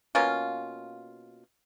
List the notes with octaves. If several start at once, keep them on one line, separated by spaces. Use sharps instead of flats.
B2 A#3 C#4 F4